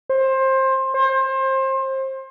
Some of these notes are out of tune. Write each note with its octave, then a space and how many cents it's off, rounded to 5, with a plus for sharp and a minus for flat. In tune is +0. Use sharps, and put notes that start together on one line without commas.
C5 +20
C5 +25